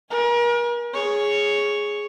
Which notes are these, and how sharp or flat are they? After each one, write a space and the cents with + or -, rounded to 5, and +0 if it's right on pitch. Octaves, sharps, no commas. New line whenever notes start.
A#4 +40 G#5 +0
G#4 +0 C#5 +0